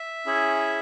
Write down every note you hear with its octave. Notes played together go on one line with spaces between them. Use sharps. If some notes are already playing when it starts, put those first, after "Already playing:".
Already playing: E5
C#4 E4 G#4